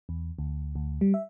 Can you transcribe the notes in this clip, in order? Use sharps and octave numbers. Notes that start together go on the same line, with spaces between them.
E2
D2
D2
G3
E5